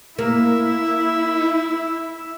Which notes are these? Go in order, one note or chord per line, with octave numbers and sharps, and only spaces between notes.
A#3 E4 E5